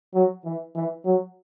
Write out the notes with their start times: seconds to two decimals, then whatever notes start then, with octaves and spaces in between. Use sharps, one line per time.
0.14 F#3
0.45 E3
0.75 E3
1.05 F#3